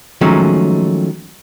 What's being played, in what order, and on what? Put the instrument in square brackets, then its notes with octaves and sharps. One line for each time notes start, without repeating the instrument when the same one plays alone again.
[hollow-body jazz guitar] D#3 F3 F#3 G#3 A3 C#4